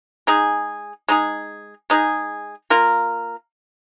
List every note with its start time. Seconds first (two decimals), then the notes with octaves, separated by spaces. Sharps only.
0.27 G#3 D#4 G#4
1.08 G#3 D#4 G#4
1.90 G#3 D#4 G#4
2.70 A#3 F4 A#4